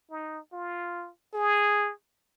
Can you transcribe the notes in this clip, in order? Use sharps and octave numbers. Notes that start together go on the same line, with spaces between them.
D#4
F4
G#4